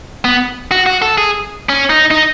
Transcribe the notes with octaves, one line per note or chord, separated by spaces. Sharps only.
B3
F#4
F#4
A4
G#4
C#4
D#4
D#4